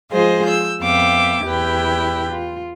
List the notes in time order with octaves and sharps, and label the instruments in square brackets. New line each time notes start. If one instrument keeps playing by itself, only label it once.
[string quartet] F3 G#3 F4 G#4 C5 D#5
E6 G6
F2 B3 E5 F5 G5 D6
E2 E4 G4 B4 G5
F4